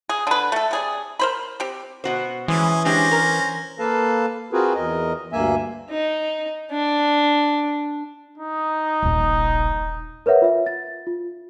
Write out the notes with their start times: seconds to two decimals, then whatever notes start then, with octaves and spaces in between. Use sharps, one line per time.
0.09 G#4
0.27 D3 B4
0.52 A3 A4
0.71 C3 G#4 D5
1.19 A#4 C5 B5
1.60 C4 G4
2.04 B2 F#4 C5
2.48 E3 G#3 C#4 D#6
2.85 G#3 C#4 D4 G4 C5 A#6
3.11 A#4
3.79 A#3 A4 B4 F5 A5
4.53 C4 F4 F#4 G#4 A#4 B4
4.75 E2 A#4 D#5
5.33 D2 G2 A#3 E5 G#5
5.90 D#4
6.71 D4
8.38 D#4
9.03 D#1 A#1
10.26 A#4 B4 C#5 E5 F#5
10.42 F4 E5
10.66 A6
11.07 F4